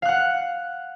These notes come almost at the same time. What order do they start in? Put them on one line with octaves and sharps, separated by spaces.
F5 F#6 F#5